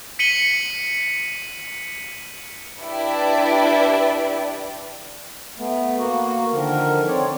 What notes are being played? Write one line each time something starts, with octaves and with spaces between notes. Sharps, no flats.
B6 C#7 D#7 F#7 G7
D4 E4 G4 B4 D5
A3 B3
A#3 F#4
D3 D#3 F3 A#4
C4 C#5 D5